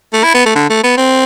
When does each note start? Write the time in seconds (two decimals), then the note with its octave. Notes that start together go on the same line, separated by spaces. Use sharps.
0.13 A3
0.23 E4
0.34 B3
0.45 A3
0.55 D3
0.69 A3
0.83 B3
0.97 C4